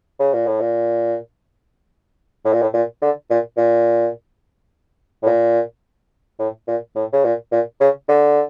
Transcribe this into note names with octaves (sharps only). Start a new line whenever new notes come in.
C#3
A#2
A2
A#2
A2
A#2
A2
A#2
D3
A#2
A#2
A2
A#2
A2
A#2
A2
C#3
A#2
A#2
C#3
D3